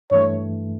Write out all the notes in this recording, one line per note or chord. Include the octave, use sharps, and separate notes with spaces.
G2 E3 A3 C#5